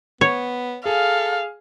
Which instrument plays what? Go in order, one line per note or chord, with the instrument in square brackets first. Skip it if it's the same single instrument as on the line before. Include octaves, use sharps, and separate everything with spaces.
[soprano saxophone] B3 [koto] C#5
[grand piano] G#4 [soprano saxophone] A4 [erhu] F5